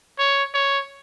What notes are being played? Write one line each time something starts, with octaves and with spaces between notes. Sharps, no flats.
C#5
C#5